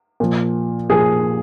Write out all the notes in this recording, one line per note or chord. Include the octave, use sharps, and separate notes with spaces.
A#2 F3
A#2 F3 G#4